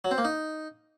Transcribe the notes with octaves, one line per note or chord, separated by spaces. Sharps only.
F#3
C4
A#3
D#4